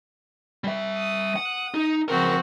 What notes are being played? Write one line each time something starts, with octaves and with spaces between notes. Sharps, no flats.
G3 E5
D#6
F#5
D#4
C#2 F3 C4 F#4 A#4